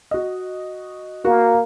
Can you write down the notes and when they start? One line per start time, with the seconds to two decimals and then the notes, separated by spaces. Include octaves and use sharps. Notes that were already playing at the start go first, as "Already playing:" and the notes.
0.11 F#4 D#5
1.25 A#3 F#4